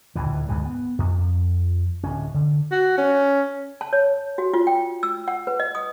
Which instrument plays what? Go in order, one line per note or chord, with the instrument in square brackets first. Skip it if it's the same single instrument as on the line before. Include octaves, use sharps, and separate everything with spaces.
[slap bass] D#1 D2 A2 E3
D2 G#2 D#3 E3
B3
F2
D1 C#4
D3
[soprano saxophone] F#4
C#4
[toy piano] A5
C#5
F#4
F4
G5
E6
F#5
B4
D#5
D#6